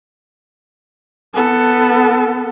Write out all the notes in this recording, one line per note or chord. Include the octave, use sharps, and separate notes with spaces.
B3 A4